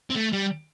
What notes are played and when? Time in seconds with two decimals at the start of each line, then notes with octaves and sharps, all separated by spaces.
0.10 C4
0.16 A3
0.33 G3